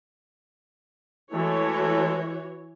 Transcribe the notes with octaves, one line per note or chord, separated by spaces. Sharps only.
E3 G#3 A3 F#4 A4 C#5